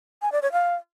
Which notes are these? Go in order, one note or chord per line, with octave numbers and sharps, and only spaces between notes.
G#5
D5
C#5
F5